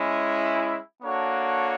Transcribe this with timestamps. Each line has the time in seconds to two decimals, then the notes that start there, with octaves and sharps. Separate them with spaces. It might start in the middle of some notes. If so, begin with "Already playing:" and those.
Already playing: G#3 C#4 E4
1.03 A#3 D4 F#4 A4 C#5